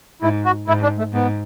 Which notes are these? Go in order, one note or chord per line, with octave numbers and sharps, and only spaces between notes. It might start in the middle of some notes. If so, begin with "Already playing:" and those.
G#2 E4
F#4
G#2 E4
D4
A3
G#2 B3